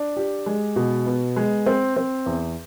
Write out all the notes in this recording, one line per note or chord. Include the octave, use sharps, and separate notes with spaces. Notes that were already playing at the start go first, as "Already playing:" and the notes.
Already playing: D4
G4
G#3
B2
B3
G#3
C4
C4
E2